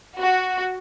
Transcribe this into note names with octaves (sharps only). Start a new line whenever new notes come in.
F#4